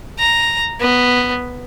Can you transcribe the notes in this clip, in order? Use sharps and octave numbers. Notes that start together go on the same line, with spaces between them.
A#5
B3